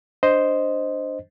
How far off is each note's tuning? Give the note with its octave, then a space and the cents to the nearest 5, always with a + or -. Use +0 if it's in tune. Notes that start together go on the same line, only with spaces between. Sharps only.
D4 +0 C5 +0 D#5 +0